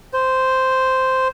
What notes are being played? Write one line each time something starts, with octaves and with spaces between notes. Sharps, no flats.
C5